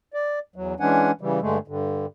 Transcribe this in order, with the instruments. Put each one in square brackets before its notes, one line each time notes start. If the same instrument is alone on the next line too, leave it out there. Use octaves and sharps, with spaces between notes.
[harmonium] D5
E2 F#3
E3 G#3 C#4 D4 F#5 G#5
C#3 E3 G3
G2 D3 G#3 A3
G2 D3